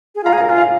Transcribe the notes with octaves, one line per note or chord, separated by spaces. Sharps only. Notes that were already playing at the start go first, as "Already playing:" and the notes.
G#4
F4 F5 A#5
G#4
A#4 F5 A#5
F4 G#5
F5